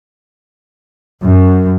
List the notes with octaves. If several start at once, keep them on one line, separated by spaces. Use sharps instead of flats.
F#2